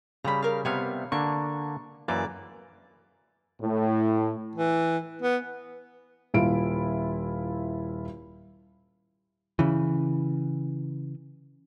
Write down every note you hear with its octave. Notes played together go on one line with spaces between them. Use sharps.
C#3 G3 A#5 B5
A#4 F5
C3 G3 B3 C#5 F5
D3 A#3 D4 C#6
F#2 E3 A#3 D5
A2
E3
B3
D#1 E4 F4 D7
C#3 E3